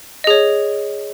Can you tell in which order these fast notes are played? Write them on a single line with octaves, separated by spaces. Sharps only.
D#5 G#4 C#5